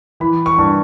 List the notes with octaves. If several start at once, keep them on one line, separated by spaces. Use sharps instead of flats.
E3 B5
C#6
G2